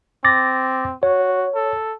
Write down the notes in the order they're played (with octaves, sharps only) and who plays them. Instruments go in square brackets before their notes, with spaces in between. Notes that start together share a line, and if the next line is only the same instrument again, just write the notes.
[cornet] C4 [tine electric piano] D6 A6 A#6
[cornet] F#4 [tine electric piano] C#5
[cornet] A4